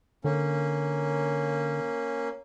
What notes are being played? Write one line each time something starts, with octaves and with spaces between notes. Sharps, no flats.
D3 A#3 C#4